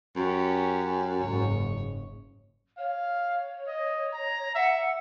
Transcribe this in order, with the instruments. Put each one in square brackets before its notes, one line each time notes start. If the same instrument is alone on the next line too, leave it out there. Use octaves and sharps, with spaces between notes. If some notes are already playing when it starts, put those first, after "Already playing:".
[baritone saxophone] F#2 [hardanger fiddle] C#4 G4
[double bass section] F#1 G#2 [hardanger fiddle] C#5
[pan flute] C#5 [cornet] F5
[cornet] D#5
A#5
[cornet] E5 [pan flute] F#5